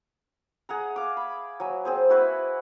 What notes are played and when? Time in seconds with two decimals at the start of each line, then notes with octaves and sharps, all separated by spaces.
0.69 G#4 F#5 A#5
0.96 F5 D6
1.17 B5
1.60 F#3 G#5
1.85 C4 G#4 C5
2.10 E4 F#4 B4 E5